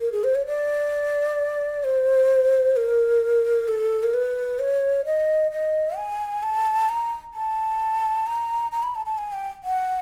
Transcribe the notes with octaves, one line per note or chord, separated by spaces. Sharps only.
A#4
G#4
C5
C#5
D5
C5
A#4
A4
A#4
B4
C#5
D#5
D#5
G#5
A5
A#5
A5
A#5
A#5
B5
A5
A5
G#5
G5
F#5